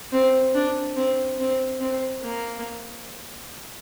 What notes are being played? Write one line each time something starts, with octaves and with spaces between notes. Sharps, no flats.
C4
D4
C4
C4
C4
A#3